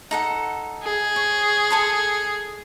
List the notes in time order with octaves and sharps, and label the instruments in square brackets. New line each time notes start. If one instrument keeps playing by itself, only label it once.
[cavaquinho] D#4 A4 F#5
[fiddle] G#4
[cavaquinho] C#5
A4 A5 C6